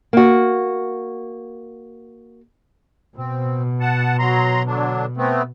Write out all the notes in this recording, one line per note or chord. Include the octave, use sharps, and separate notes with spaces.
A#3 F#4
B2 C4
F#5 A5
F#3 A#5 C6
D3 F#3 D4
A3 B3 C4